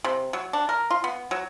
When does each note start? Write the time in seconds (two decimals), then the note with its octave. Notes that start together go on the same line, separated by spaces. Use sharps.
0.04 C3
0.33 F#3
0.53 D4
0.69 A#4
0.91 F4
1.04 B3
1.31 F#3